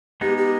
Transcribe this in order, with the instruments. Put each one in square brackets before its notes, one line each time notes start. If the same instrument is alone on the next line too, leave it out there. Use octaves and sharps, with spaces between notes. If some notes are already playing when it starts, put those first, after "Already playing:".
[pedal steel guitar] G#3 B3 D#4 [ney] G4
[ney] G4